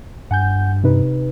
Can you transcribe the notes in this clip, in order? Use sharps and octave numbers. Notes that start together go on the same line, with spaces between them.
G2 F#5 G#5 G6
C3 D#4 B4